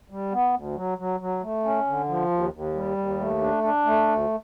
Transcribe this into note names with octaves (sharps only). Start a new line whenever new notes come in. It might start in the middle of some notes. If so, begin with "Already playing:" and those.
G3
B3
D2
F#3
F#3
F#3
A3
C#4
D3
F3
D#2
D#2
G3
D#2
A3
D4
D4
A3
D2